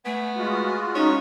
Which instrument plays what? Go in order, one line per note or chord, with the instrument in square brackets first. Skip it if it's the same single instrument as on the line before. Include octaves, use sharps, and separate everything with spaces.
[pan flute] A3 [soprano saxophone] B3 [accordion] G#5
[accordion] G#3 F4 F#4
[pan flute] C#4 [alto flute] D#4 [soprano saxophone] C#5